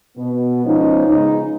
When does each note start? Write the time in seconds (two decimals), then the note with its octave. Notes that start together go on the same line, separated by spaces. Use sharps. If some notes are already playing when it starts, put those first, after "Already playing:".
0.17 B2 B3
0.65 F3 G#3 C#4 D#4
1.07 C#3 G#3 B3 D#4